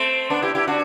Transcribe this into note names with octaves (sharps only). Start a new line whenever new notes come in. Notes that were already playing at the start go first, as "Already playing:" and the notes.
Already playing: A3 C4
B3 D4
E4 G4
E4 G4
D4 F#4